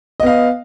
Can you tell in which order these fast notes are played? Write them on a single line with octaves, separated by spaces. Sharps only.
D#5 B3 F5